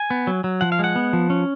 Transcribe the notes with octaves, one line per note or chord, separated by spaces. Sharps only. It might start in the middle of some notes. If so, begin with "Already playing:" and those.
Already playing: G#5
B3
F#3
F#3
F3 F#5
F5
G#3 F#5
B3
F3
C#4